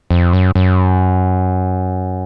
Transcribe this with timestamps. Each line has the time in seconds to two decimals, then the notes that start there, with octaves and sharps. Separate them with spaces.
0.11 F2
0.33 F#2
0.55 F#2